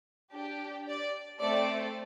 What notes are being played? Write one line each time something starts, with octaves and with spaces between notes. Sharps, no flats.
D4 G4
D5
A3 C4 A4 D5